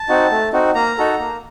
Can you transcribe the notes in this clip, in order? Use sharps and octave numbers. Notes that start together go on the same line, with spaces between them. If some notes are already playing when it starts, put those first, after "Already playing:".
Already playing: A5
C4 D#4 F#4
A3
C4 D#4 F#4
A#3 A#5
D#4 F#4 A4
A#3